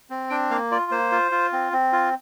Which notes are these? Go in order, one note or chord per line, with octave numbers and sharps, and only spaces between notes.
C4
D4 G5
A#3 F5
F4 D5
A#3 C5
F4
F4
C4
C4
F4